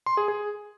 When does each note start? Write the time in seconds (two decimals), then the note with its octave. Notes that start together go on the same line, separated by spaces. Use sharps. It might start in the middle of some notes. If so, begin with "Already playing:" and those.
0.06 C6
0.17 G#4
0.28 G#4